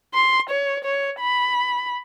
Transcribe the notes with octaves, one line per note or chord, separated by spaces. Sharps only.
C6
C#5
C#5
B5